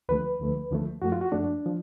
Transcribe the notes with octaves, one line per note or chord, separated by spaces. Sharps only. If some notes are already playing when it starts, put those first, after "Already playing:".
D2 D3 F3 A3 B4
D2 D3 F3 A3
D2 D3 F3 A3
F#2 F3 A3 F#4
F4
F#4
F#2 F3 A3 D4
F3